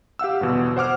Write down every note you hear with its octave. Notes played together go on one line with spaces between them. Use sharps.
G4 F5 F#5 E6
G1 E2 B2
C5 F#5 D6 F6